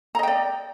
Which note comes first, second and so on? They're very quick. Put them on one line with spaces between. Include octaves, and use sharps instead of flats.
A#5 D#5 G5 D5